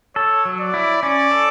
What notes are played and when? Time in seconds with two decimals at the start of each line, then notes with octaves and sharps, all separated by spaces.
0.15 A4 C#5
0.45 F#3
0.59 D5
0.74 E4
1.02 C#4 D5
1.31 A4